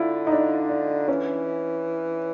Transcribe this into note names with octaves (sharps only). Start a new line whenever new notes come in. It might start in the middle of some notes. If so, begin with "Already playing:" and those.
Already playing: D3 E4 F4
D#4
D4
D4
E3 C#4